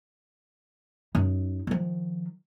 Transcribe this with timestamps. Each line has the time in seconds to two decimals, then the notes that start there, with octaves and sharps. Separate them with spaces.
1.15 F#2 D#4
1.67 D#3 F3